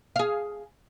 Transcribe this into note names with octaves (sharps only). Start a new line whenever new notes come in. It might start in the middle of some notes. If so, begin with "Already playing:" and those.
G#4 F5